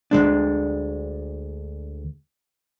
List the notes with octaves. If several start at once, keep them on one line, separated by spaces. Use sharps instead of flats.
D2 G#2 G#3 D4